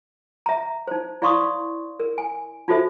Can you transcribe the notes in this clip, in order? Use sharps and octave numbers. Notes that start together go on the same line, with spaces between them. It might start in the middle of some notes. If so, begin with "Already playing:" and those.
E5 A#5
D#4 C5
E4 D5 F5 C6 C#6 D#6
A#4
G#5
D#4 F4 F#4 A4 C5 E5